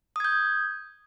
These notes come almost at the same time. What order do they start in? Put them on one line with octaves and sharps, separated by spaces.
D#6 G#6 G6